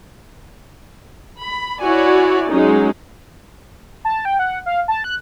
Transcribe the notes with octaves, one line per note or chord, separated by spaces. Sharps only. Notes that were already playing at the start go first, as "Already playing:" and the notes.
B5
E4 F#4 C#5 D5 G#5
F#3 G#3 C#4 D#4
A5
G5
F#5
F5
A5
F#6